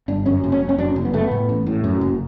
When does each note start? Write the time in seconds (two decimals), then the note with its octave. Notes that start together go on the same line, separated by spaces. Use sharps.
0.08 G1 D4
0.26 F#2 C#4
0.44 F#1
0.52 C#4
0.61 F#1
0.69 C#4
0.78 F#2 D4
0.96 F#1
1.05 B3
1.14 F#1 A3
1.24 B3
1.31 A2
1.49 A1
1.66 A2
1.84 F#2
2.01 F#1